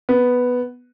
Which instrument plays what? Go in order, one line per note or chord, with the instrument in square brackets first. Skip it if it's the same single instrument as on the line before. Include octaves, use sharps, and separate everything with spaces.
[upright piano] B3